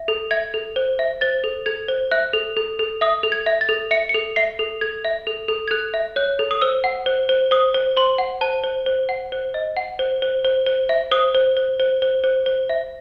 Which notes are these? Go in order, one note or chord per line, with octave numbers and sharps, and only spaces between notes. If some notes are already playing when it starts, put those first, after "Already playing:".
Already playing: E5
A4
E5 G#6
A4
C5
E5
C5 A6
A4
A4 G#6
C5
E5 F#6
A4
A4
A4
E5 D#6
A4
G#6
E5
A6
A4
E5 C#7
C#7
A4
E5 C7
A4
A4 G#6
E5
A4
A4
G#6
A4 F#6
E5
C#5 F#6
A4
D#6
C5 E6
F#5
C5
C5
C5 D#6
C5
C5 C6
F#5
C5 A5
C5
C5
F#5
C5
D#5
F#5
C5
C5
C5
C5
E5
C5 D#6
C5
C5
C5
C5
C5
C5
E5